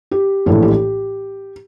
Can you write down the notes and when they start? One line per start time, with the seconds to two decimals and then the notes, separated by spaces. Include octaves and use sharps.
0.11 G4
0.46 A#1 A2 E3 A4
0.62 G4